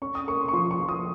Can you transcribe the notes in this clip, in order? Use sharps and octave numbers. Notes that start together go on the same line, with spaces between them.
C#4 C#6
D#6
A#3 C#6
C6
C#6
F3 C6
C#6
F3
D#6